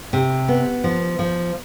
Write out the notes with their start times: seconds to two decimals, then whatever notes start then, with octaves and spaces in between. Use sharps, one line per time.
0.13 C3
0.48 B3
0.84 F3
1.19 F3